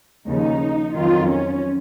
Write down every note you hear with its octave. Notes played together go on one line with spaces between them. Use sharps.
D#2 C#3 F3 D#4
F2 D#3 F#3 F4
C#4